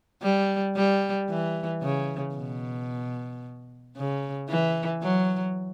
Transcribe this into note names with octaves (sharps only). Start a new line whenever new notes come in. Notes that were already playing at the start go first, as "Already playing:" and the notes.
G3
G3
E3
C#3
B2
C#3
E3
F#3